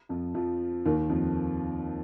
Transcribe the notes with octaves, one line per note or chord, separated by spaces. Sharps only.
F2 F3
F2 F3
D#2 D#3
F2 F3